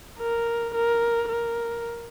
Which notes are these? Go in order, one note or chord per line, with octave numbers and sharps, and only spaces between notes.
A#4
A#4
A#4